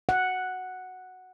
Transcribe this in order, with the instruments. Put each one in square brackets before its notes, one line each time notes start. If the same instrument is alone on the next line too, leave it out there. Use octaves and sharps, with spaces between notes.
[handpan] F#5